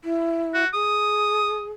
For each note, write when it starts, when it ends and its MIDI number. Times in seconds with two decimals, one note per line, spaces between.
0.04 0.64 64
0.54 0.67 66
0.73 1.72 68
0.73 1.65 87